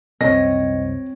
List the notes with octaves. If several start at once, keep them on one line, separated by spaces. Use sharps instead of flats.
C2 F#2 C4 C#5 D#5 A#6